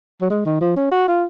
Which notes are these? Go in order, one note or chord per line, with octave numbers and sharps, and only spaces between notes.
F#3
G#3
D#3
F3
C#4
F#4
F4